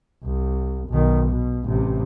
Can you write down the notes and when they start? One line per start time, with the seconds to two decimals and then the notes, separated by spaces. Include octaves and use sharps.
0.24 C2
0.89 B1 D#3
1.28 B2
1.64 A1 C3